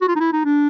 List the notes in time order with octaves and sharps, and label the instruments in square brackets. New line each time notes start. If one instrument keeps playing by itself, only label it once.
[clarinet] F#4
F4
D#4
E4
D#4
D4